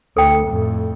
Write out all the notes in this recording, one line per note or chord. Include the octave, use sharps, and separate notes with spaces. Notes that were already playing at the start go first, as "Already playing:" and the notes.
D2 A4 G5
F2 A2